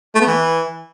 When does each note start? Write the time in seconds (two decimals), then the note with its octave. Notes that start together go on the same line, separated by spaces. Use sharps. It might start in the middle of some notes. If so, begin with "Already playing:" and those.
0.15 A3
0.21 B3
0.27 E3